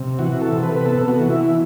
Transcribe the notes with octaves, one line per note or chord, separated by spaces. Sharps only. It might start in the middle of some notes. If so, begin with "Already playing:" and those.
Already playing: C3
E3 F#4
A4
C3
B4
B4
B3 A4
F#4
E3
E4